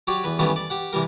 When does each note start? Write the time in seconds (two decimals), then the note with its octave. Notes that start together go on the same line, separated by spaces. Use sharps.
0.07 F#3 G4 C#5 D5
0.24 E2 B4
0.39 D#3 E3 G3 A3 B3 C#4
0.56 D5
0.70 G4 F#5
0.93 C3 E3 G3 A#4